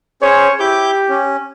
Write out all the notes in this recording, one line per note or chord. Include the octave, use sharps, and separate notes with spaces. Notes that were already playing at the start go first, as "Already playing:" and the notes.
C#4 G#4 C5 C#5
E4 G4 D6 G6
C#4